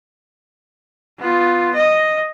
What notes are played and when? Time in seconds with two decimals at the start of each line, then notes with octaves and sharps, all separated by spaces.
1.18 B3 F4
1.74 D#5